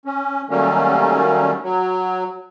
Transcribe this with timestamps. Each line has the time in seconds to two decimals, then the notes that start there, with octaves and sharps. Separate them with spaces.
0.05 C#4
0.50 D#3 F#3 G3 A3 A#3 C#4
1.63 F#3